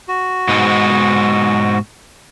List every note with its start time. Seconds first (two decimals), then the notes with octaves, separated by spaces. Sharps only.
0.08 F#4
0.48 G#2 B2 G#3